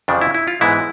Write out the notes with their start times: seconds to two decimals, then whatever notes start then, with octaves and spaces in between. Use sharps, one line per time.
0.08 F2 C#3 F3 D4
0.22 E4
0.35 E4
0.48 F4
0.61 G#2 E3 G#3 B3 E4